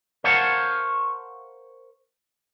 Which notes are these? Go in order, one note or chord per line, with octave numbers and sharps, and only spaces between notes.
A#4 C5 C#5 F5 F#5 A5